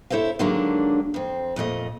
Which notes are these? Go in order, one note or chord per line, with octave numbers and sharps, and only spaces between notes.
E4 A4 C5 C#5 F5
D3 D#3 F#3 G#3 A#3 D4
F2 C4
F2 A#2 A3 D#5